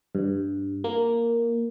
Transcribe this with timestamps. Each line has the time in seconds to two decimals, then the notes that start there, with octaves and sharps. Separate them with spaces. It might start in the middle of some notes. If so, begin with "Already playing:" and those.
0.15 G2
0.84 A#3